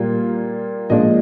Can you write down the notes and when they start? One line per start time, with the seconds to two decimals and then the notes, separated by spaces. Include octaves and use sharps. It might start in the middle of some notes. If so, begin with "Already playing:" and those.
Already playing: A#2 G3 A#3 F4
0.90 A#2 F3 G#3 D4 D#5